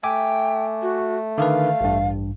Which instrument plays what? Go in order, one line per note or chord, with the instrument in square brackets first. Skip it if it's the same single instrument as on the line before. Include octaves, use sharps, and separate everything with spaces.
[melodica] A3 [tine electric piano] E5 G#5 D6 [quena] G5
[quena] F#4
[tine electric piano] D3 D#3 B4 [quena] F5
[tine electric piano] A1 G2